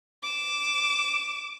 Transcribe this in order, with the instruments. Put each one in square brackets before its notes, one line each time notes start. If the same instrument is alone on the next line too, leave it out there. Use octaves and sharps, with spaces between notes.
[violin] D6 E7